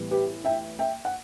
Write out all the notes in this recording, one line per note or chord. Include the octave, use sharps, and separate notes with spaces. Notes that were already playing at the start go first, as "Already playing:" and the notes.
Already playing: A2 E3 G3 B3
G4 B4
E5 G5
E5 G5
F#5